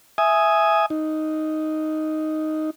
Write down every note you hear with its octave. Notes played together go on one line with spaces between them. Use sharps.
E5 G#5 D#6
D#4